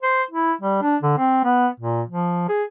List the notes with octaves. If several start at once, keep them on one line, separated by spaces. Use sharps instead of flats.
C5
E4
G3
D4
D3
C4
B3
A#2
F3
G#4